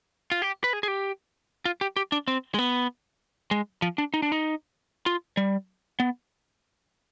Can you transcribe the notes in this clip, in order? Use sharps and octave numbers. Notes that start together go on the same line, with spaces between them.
F4
G4
B4
G#4
G#4
G4
F4
G4
G4
D4
C4
G#3
B3
G#3
F3
D4
D#4
D4
D#4
F4
G3
B3